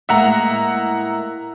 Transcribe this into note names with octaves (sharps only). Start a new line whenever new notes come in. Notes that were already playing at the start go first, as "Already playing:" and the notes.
A2 G#3 A#3 E5 F#5 A#5